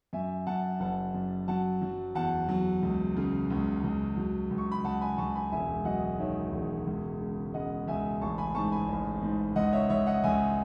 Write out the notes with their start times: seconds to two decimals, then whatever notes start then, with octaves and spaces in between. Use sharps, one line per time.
0.13 F#2 E5 G#5
0.47 F#2 F#5 A5
0.80 F#1 F#5 A5
1.14 F#2
1.48 F#3 F#5 A5
1.82 F#3
2.15 E2 F#5 A5
2.49 F#3
2.83 C#2
3.16 C#3
3.50 C#2
3.84 C#2
4.17 F#3
4.51 C#2
4.58 C#6
4.72 B5
4.84 C#2 F#5 A5
5.01 G#5 B5
5.18 C#2 A5 C#6
5.35 G#5 B5
5.52 E1 E5 G#5
5.85 F#3 D#5 F#5
6.19 D#3 C#5 E5
6.52 E1
6.87 C#2
7.20 C#3
7.54 C#3 D#5 F#5
7.87 C#2 E5 G#5
8.21 A1 A5 C#6
8.38 G#5 B5
8.55 G#2 A5 C#6
8.72 G#5 B5
8.88 A1
9.22 G#2
9.56 C#2 D#5 F#5
9.73 C#5 E5
9.89 C#2 C#5 E5
10.07 D#5 F#5
10.24 C#2 E5 G#5